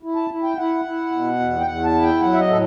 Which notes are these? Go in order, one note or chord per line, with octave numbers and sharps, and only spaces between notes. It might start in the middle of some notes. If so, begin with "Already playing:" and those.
E4
A5
E4
G5
E4 F#5
E4
B2
E2
G5
E2 F#5
A5
E4
G5
F#3 F#5
E5
D#5
A2 A4